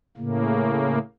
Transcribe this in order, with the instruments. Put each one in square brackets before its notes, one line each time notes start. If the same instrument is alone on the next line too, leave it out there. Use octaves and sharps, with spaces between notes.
[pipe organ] A2 C#3 A#3